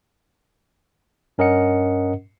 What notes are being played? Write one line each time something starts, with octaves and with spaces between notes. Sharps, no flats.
G2 C#4 A#4 D#5 F#5 C#7